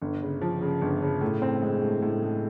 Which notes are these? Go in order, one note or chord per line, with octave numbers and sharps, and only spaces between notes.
G1
C#3
F3
C#3
G1
C#3
A2
C4
G#3
A2
A2
G#3